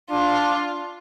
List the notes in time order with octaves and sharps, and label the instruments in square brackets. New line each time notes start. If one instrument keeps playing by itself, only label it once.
[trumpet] D4 [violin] F4